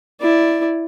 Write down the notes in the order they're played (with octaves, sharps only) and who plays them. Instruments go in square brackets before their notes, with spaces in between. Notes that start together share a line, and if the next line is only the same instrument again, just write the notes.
[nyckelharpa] E4 D5